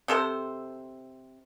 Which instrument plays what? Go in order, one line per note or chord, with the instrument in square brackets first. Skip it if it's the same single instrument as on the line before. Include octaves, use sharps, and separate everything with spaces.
[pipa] C3 A4 C5